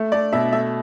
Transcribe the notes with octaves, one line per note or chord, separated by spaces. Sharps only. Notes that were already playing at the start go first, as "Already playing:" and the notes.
Already playing: A3
A3 D5
B2 E5
A3 E5